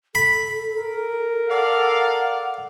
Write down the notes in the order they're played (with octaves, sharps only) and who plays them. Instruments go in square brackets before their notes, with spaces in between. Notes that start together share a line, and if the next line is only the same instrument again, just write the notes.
[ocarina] A4 [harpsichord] B5
[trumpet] A#4
[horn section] A4 D5 F5 [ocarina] F#5